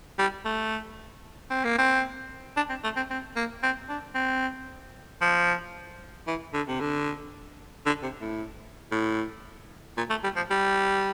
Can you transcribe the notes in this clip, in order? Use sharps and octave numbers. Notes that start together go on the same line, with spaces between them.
G3
A3
C4
A#3
C4
D4
C4
A3
C4
C4
A#3
C4
D4
C4
F3
E3
D3
C3
D3
D3
C3
A2
A2
A#2
A3
G3
F3
G3